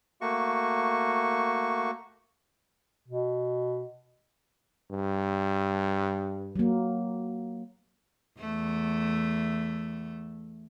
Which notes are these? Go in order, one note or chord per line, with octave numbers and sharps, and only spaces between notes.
A3 A#3 F#4 C#6
B2
G2
F#3 A#3
E2 A3